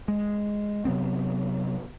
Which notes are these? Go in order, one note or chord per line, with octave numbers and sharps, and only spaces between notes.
G#3
C3 F#3 B3 C4